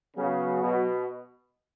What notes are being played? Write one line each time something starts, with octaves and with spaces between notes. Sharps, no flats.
C#3 F#3 B3 F#4
B2